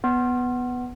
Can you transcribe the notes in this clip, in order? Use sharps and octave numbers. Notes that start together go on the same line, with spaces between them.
B3